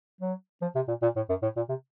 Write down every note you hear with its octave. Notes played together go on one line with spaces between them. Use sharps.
F#3
F3
C3
A#2
A#2
A2
F#2
A2
A#2
C3